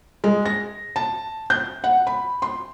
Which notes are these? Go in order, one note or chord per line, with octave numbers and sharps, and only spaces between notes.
G#3
A#6
A5
G6
F#5
B5
C6